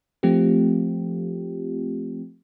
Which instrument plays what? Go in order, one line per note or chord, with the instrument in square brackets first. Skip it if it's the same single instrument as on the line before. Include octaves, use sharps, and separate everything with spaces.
[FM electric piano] F3 A3 C4 F4 G4